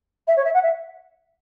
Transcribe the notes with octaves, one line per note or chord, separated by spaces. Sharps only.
E5
C#5
E5
F#5
E5